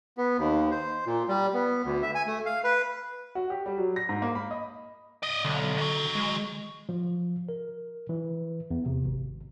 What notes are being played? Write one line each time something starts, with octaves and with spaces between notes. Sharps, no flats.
B3
D#2
C5
A#2
G3
B3
D2
E5
G#5
A3
F5
B4
F#4
G4
G3
F#3
A#6
G#2
A#3
B5
D#5
D5 D#5
B1 D3
D#3 F#3
G#3
F3
A#4
E3
E2
C3
G#1